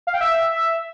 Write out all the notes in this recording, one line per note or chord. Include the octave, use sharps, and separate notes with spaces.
F5
G5
E5